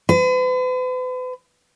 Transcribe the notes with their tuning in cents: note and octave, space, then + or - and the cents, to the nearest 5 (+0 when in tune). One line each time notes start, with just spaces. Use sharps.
B4 +45